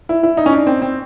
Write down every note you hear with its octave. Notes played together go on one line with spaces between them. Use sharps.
E4
E4
D#4
C#4
D4
C4
C4